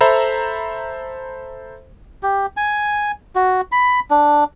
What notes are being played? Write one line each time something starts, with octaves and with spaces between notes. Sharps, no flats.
A4 C5 E5 A#5 B5
G4
G#5
F#4
B5
D4